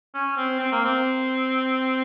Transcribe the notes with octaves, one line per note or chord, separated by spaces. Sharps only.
C#4
C4
C4
A#3
C4